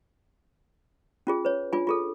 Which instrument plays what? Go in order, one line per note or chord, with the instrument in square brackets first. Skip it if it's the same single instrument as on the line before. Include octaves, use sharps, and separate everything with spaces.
[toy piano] C#4 F4 G#4
B4 C#5
D4 F4 G#5
F4 G#4 A4